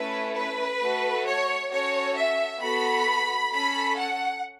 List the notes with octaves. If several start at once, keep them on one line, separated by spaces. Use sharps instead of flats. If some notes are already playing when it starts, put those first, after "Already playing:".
Already playing: A3 C#4 E4 A4 B4
B4
A3 F#4 A4
C#5
C#4 F#4 A4 C#5
E5
B3 F#4 A4 B5
C#4 A4 B5
F#5